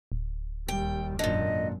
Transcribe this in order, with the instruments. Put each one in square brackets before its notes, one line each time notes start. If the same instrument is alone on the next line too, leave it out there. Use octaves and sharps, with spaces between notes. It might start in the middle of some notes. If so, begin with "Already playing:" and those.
[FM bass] D1
[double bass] D#2 G3 [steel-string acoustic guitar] G5
[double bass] G#1 F#2 [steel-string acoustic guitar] A#2 D3 [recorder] D#5